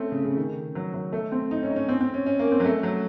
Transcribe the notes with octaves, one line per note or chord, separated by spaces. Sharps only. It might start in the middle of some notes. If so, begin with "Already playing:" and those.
Already playing: A3 C4 C#4
C#3
C#3
D#3
F#3
F#3
A3
C4
D#4
C#4
D#4
C#4
C4
C4
C#4
C#4
A#3
C4
F#3
A3
F#3